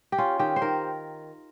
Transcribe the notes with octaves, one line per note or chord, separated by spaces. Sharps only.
G4
C#4 F4
D#3 G4
C5
D#3 A#4